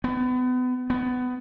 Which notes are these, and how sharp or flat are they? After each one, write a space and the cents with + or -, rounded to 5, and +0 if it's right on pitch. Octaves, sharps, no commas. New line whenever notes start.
B3 +30
B3 +20